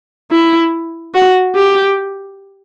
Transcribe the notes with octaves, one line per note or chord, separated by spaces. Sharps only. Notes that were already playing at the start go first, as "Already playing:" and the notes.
E4
F#4
G4